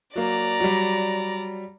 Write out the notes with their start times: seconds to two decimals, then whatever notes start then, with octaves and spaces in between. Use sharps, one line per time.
0.16 F#3 A#3 D5 A#5
0.60 F#3 G3